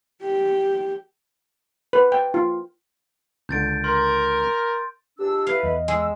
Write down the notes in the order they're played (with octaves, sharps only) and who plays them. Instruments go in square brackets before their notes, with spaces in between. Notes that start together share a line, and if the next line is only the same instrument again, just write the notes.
[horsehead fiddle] G4
[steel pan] B4
G5
F4
[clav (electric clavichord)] C#2 D3 [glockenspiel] G6 A6 D7
[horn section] A#4 [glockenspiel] C6
[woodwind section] C#2 D4 E6 [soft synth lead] G4
[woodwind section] E4 A4 B4 [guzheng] F5
[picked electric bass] E2 [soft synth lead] D#5
[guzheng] G#3 [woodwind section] E6